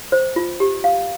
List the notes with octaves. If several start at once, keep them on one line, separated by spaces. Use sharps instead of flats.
C5
F4
G4
F5